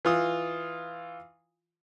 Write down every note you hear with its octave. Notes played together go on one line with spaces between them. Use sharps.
E3 F4 D#6